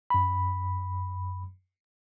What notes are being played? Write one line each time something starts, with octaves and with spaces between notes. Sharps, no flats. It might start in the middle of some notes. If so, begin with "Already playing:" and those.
F#2 B5